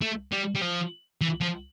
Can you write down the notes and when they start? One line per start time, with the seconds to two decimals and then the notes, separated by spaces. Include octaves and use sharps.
0.01 A3
0.32 G3
0.55 G3
0.62 F3
1.21 E3
1.41 F3